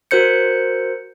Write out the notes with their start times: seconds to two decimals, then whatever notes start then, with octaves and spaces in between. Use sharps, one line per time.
0.11 F#4 A#4 C5 G6 C#7